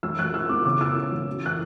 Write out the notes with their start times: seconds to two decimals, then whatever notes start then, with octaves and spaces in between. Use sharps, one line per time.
0.03 F#3 E6
0.19 F#3 F#6
0.34 E4 E6
0.49 B3 D6
0.65 C#3 D6
0.80 E4 E6
0.96 C#4
1.12 F#3
1.27 E3
1.43 E3 F#6